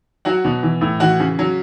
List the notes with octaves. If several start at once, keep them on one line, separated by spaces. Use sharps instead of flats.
F#3 F#4 F#5
B2
E3
A2
E3 F#4 F#5
C#3
F#3